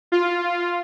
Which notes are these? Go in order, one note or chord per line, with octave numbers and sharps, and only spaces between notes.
F4